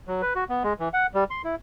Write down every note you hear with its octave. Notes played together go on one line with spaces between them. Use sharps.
F#3
B4
F#4
B3
G#3
E3
F#5
G3
C6
E4